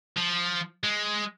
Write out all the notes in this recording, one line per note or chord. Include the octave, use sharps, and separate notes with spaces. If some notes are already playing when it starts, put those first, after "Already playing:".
F3
G#3